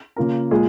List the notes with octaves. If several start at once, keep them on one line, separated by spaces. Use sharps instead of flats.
C#3 A#3 F4 A#4
A#2 G#3 F4 G#4